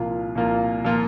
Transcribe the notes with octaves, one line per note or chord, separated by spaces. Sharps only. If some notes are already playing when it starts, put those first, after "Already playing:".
Already playing: C2 A#2 F3 A#3 F4
C2 A#2 F3 A#3 F4
A#2 F3 A#3 F4